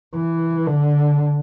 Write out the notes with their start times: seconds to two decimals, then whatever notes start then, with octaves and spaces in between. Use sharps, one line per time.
0.15 E3
0.67 D3